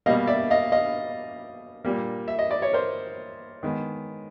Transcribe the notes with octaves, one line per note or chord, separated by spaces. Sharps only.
B2 G3 A#3 D#5 F5
D5 E5
D#5 F5
D#5 F5
A#2 G3 A#3
E5
D#5
D5
C#5
A#4 C5
D#3 G#3 B3